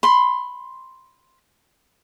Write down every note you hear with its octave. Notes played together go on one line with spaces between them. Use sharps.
B5 C6